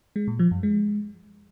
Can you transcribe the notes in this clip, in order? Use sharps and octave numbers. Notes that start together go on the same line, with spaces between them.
G#3
A#2
F3
F#2
G#3